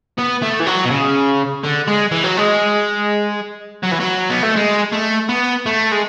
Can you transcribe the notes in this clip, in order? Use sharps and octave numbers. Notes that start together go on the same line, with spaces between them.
B3
A3
E3
F#3
B2
C#3
D3
G#3
E3
F#3
G#3
F#3
E3
F#3
B3
A3
G#3
A3
B3
A3
G#3